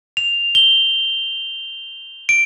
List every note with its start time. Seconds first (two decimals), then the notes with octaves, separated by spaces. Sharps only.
0.17 F7
0.55 G7
2.29 D7